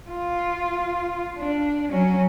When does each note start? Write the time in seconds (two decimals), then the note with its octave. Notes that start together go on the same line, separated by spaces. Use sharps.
0.10 F4
1.38 D4
1.91 F#3 C#4